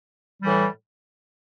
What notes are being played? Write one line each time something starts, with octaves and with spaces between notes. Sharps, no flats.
A2 E3 G3